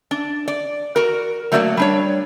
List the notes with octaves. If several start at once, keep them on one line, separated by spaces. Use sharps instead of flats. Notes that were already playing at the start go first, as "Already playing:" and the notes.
D4
D5
F#4 A#4
F#3 A3 A#3 F#4 C#5 D5
G3 D4 C#5